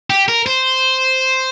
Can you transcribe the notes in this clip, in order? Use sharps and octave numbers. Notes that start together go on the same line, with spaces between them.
G4
A#4
C5